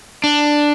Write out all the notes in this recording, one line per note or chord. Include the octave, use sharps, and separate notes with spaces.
D4